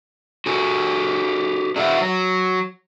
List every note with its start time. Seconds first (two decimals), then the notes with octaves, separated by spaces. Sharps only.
0.46 F#4 G#4 A4
1.76 D4 F#4 G#4 A#4 E5 F#5
2.01 F#3